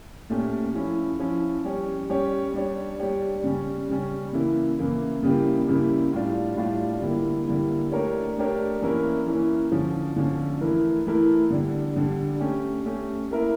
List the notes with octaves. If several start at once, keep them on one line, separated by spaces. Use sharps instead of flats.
A#2 A3 C#4 G4
F3 C#4 E4
F3 C#4 E4
G3 C#4 G4 C#5
G3 C#4 G4 C#5
G3 D4 G4 C#5
G3 D4 G4 C#5
C#3 G3 C#4
C#3 G3 C#4
C#3 E3 A#3 E4
C#3 E3 A#3 E4
C#3 G3 A#3 E4 G4
C#3 G3 A#3 E4 G4
A2 G3 D4 F4
A2 G3 D4 F4
D3 G3 A#3 E4
D3 G3 A#3 E4
A3 D4 G4 A#4 C#5
A3 D4 G4 A#4 C#5
E3 A#3 C#4 E4 A#4
E3 A#3 C#4 E4 A#4
D3 F3 C#4
D3 F3 C#4
E3 A3 E4 A#4
E3 A3 E4 A#4
D3 G3 D4
D3 G3 D4
A3 C#4 G4
A3 C#4 G4
A#3 E4 A#4 E5